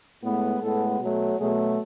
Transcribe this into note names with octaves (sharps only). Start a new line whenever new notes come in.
A2 G#3 B3
A2 G#3 B3 A4
B2 F#3 A3
B2 F#3 A3 G#4